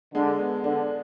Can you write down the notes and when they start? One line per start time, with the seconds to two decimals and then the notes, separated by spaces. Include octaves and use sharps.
0.15 D3 G#3
0.39 B3
0.64 D3 D4